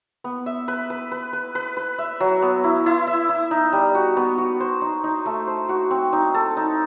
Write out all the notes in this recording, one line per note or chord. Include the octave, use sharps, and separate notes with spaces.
B3
E5
B4
B4
B4
B4
B4
B4
E5
F#3
B3
E4
E4
E5
E4
D#4
G3
F#4
B3
F#4
C5
D#4
D#4
A3
C5
F#4
C4
D#4
A4
D#4